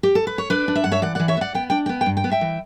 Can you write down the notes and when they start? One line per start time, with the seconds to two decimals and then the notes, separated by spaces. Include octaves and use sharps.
0.03 G4
0.15 A4
0.27 B4
0.38 C#5
0.50 D4 B4 D5
0.68 D4
0.76 E5
0.84 G2 F#5
0.92 C#5 E5
1.02 E3 D5 F#5
1.15 E3 D5 F#5
1.28 C#5 E5
1.37 B3
1.41 D5 F#5
1.54 B3 G5
1.70 D4 G5
1.86 G5
1.89 B3
2.01 G5
2.06 G2
2.17 G5
2.24 B3
2.32 E5 G5
2.41 E3